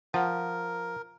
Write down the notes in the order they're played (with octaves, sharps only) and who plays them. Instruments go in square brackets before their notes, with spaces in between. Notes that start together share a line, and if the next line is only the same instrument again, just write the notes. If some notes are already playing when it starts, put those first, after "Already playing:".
[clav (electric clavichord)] F3 [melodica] A#4 [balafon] F#5